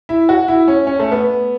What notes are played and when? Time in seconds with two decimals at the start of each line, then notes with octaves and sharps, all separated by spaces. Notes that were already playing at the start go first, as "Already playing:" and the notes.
0.09 E4
0.29 F#4
0.48 E4
0.68 C#4
0.87 C#4
0.99 A3
1.12 B3